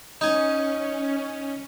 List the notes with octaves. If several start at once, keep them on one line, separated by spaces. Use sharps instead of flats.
C#4 D#4 G#5